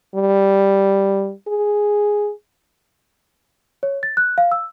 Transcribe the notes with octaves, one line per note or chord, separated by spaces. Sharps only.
G3
G#4
C#5
A6
F#6
F5
E6